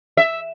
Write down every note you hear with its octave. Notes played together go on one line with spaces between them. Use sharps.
E5